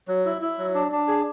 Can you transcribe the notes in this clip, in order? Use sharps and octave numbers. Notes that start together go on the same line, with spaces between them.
F#3
E4
E4
F#3
D4
D4
G#4